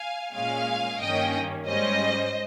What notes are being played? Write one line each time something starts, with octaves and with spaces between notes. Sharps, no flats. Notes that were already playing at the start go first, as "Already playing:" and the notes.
Already playing: F5 G#5
A#2 G#3 C#4 F5 G#5
G2 D#3 A#3 C#4 D#5 G5
G#2 G3 C#4 C5 D#5